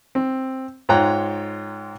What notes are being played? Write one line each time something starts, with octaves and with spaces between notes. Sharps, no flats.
C4
G#2 F4 C#5 G5 A#5 F#6